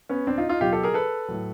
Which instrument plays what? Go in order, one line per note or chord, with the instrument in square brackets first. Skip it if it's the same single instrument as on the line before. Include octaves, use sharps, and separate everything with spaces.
[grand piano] B3 C#4
C4 D4
D#4 F4
D#4 F4
B2 F#3 F4 G4
G4 A4
G#4 A#4
A4 B4
A2 F#3